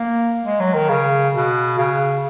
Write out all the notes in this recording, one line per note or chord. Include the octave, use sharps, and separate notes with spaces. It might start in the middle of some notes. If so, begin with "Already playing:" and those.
Already playing: A#3
G#3
F#3
D#3
C#3
B2
C#3